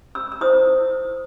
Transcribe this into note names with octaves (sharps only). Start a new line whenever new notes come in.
E6
E6
E4 C5 D#6